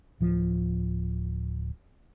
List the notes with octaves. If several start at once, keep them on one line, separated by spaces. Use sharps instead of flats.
D1 F3